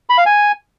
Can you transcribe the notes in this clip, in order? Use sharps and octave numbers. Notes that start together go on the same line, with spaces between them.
B5
F5
G#5